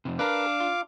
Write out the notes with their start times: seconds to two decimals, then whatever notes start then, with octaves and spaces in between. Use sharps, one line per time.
0.05 F2 C3
0.19 D4 A#4 B4 F5 D6
0.60 F4